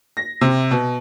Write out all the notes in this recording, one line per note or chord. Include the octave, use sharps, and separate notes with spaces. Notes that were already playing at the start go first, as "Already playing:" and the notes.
A#6
C3
B2